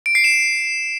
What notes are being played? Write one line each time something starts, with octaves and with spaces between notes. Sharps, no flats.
D7
C7
E7